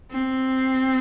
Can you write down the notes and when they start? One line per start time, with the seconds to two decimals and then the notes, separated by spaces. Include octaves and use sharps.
0.12 C4